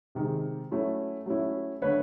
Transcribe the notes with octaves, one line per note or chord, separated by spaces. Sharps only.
C3 D#3 G#3
F#3 A3 C#4 E4
F#3 A3 C#4 E4
D3 F#3 A3 B4 C#5